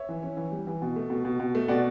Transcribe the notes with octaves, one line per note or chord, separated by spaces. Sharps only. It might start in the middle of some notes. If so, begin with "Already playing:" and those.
Already playing: C#5 E5
E3
C#4
E3
G3
E3
B2
A3
B2
B2
B2
A3
B2 D5 F#5